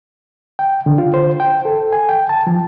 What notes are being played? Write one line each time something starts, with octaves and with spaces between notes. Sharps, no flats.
G5
D3
F4
C5
G5
A4
G#5
G5
A5
F3